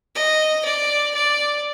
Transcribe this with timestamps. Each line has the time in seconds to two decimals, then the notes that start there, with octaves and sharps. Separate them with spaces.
0.15 D#5
0.65 D5
1.15 D5